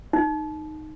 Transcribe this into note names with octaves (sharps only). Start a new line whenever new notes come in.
D#4